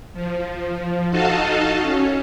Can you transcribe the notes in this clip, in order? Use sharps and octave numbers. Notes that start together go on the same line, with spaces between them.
F3
D#4 F#4 A4 D#5 F5 A5
C#4